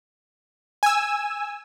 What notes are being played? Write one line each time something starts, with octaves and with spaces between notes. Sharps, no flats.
G#5 E6